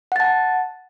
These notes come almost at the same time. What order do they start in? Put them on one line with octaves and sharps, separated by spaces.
F#5 A6 A5